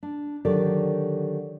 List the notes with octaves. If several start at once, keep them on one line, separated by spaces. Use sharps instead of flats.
D4
D3 D#3 F#3 G4 A4 D5